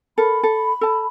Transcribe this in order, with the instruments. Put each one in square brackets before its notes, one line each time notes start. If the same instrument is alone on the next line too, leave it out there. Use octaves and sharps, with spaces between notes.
[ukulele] A4 A#4 [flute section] B5
[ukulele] A4
A4 A5